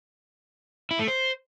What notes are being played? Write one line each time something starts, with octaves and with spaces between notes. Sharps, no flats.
E4
A3
C5